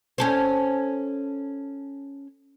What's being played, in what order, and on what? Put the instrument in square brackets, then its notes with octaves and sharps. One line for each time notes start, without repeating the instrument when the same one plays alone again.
[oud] C#4 A4 C5